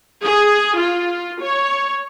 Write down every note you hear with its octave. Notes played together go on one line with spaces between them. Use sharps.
G#4
F4
C#5